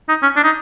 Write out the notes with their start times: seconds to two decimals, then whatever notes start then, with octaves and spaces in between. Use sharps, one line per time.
0.09 D#4
0.22 C#4
0.36 D4
0.44 D#4